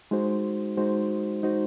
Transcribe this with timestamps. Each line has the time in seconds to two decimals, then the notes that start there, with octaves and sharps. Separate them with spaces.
0.11 G#3 D#4 F#4 C5
0.77 G#3 D#4 F#4 C5
1.43 G#3 D#4 F#4 C5